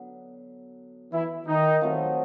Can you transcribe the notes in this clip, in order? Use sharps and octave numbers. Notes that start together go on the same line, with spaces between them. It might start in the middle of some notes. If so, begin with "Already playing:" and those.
Already playing: D3 F#3 B3
E3 E4
D#3 D#4
F#3 A3 C4 F4